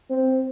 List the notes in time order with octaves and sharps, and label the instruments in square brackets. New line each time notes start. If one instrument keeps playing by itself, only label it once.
[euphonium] C4